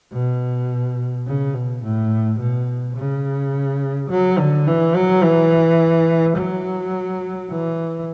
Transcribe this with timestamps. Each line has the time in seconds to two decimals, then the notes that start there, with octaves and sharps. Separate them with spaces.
0.12 B2
1.27 C#3
1.54 B2
1.83 A2
2.39 B2
2.96 C#3
4.10 F#3
4.38 D3
4.67 E3
4.95 F#3
5.23 E3
6.37 F#3
7.51 E3